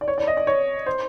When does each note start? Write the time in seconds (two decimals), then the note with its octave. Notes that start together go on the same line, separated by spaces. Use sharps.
0.01 D5
0.08 C#5
0.18 D5
0.27 D#5
0.37 D5
0.47 C#5
0.86 C5